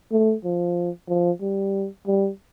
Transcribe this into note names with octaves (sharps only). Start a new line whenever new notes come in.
A3
F3
F3
G3
G3